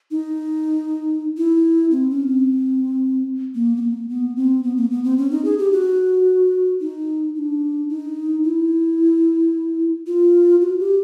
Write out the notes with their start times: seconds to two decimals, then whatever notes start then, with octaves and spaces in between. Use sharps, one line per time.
0.11 D#4
1.37 E4
1.91 C4
2.10 C#4
2.28 C4
3.55 A#3
3.77 B3
3.82 A#3
4.09 B3
4.36 C4
4.63 B3
4.77 A#3
4.91 B3
5.04 C4
5.18 C#4
5.31 D#4
5.45 G#4
5.58 G4
5.72 F#4
6.81 D#4
7.35 D#4
7.39 D4
7.89 D#4
8.44 E4
10.07 F4
10.61 F#4
10.79 G4